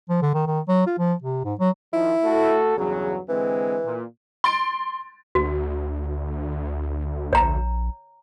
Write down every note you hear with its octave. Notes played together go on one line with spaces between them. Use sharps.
F3
D3
D#3
D#3
F#3
F4
F3
C3
G#2
F#3
D#3 F3 E4
A3 F#4 A4
E2 G2 C#3 F#3
D3 E3 G#3 C4
A#2
C6 A6 D7
D2 F#4
A#1 C#5 A#5